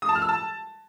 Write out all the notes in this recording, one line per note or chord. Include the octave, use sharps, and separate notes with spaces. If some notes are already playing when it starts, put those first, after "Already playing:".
D#6
A5
F6
E6
A5